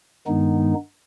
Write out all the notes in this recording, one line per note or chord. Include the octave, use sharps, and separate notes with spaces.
G2 D#3 G#3 B3 D#4